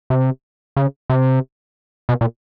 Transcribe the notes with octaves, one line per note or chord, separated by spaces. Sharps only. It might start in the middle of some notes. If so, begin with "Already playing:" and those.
C3
C#3
C3
B2
A#2